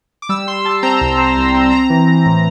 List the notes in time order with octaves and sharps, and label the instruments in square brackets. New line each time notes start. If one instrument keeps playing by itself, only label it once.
[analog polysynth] D6
G3 E6
G3 C6
G3 A5
C4 A#5
C2
C4
C2
C4
C4 A#5
E3
E3
A2